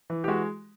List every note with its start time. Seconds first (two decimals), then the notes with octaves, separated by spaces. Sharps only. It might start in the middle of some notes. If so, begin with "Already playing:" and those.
0.10 E3
0.24 G4
0.28 G#3 F#4